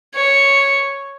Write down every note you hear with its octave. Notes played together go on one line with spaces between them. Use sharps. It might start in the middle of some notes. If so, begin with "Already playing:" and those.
C#5